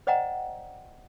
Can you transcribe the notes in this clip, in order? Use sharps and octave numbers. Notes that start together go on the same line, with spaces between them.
C5 D5 D#5 F#5 G5 A#5